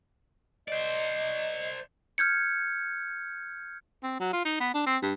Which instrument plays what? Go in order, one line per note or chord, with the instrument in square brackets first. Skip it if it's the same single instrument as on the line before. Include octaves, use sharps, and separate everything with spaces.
[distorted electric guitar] C5 D5 [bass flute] D#5
[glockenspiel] F6 G6 G#6 C#7
[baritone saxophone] C4
F#3
F4
D#4
B3
D4
C4
G2